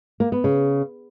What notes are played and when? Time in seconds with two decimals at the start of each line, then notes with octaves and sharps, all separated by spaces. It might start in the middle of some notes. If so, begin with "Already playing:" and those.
0.20 A#3
0.32 B3
0.44 C#3